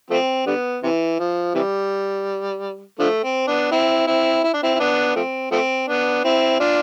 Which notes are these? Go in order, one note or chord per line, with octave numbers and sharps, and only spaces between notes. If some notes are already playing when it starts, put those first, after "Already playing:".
F3 A3 C4
D3 G3 B3
C3 E3
F3
C3 E3 G3
D3 F3 A3
C4
B3 D4
C4 E4
C4 E4
E4
D4
C4 E4
E4
B3 D4
F3 A3 C4
F3 A3 C4
B3 D4
C4 E4
D4 F4